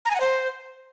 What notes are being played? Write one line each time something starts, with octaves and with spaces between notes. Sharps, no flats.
A#5
G#5
F#5
C5